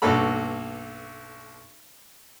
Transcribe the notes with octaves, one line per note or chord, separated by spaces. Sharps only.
B1 G2 A#3 F#4 A4 B5